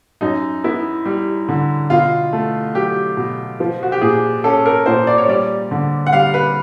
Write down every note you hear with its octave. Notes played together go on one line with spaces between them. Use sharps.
F#2 D#4
B3 E4
G3
D3
B2 F4
A3
F#3 G4
B2
F3
F#4
G4
A#2 G#4
C#4 A4
A#4
A#2 C5
D5
C#5
G3 D5
D3
F#5
G3 F5
B4